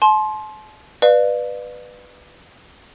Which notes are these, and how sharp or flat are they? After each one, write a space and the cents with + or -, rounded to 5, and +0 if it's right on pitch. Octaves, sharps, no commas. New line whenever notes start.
A5 -40 C6 +15
B4 +0 D5 +30 F5 +0